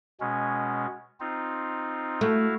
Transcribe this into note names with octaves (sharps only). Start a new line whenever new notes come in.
B2 G#3 C#4
C4 D#4 F4
A3 E4 F#4 F5